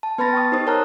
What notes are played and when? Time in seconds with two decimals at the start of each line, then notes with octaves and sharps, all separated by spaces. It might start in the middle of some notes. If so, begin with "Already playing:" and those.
0.03 A5
0.18 B3 B4 A5 B5 A6 A#6
0.33 G5 C#6 D#6
0.52 D#4 G4 C5 D#6
0.67 A#4 C#5 A5 A#5 F6 F#6